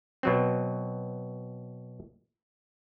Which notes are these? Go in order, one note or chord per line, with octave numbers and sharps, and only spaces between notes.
B2 F#3 C4